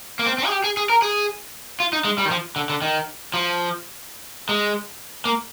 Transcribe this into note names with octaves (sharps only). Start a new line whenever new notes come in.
A#3
C4
C4
G#4
G4
G#4
G#4
A#4
G#4
F4
D#4
G#3
G3
D#3
F3
D3
D3
D#3
F3
G#3
A#3